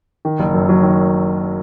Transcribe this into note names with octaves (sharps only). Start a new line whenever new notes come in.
D#3
F#1
F#2
F#3
D#3